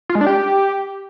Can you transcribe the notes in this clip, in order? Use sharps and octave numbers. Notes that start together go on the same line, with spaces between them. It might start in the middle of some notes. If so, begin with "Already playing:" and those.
F4
G#3
D4
G4